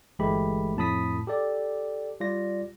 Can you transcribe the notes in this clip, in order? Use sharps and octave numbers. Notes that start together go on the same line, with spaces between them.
G1 E3 G#3 A3 G4 B5
F2 A2 A5 B5 D#6 B6
G4 A4 D5
G3 F4 D5 A#6